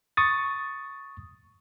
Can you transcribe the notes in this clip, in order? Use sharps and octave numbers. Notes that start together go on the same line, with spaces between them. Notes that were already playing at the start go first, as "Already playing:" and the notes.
C#6 D#6 A6